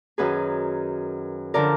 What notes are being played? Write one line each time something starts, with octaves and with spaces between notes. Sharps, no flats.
F#2 D#3 G#4 B4
D3 F3 A#4 D5